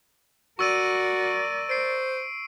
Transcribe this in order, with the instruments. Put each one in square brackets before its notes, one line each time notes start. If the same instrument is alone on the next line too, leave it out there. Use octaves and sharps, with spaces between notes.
[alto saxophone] F#4 [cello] A#4 D5 [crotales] C#6 E6 D#7
[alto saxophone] C5 [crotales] C7 D7